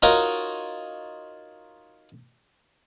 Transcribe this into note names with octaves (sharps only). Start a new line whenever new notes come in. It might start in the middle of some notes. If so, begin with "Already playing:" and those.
D#4 F4 F#4 A#4 C#5 D#5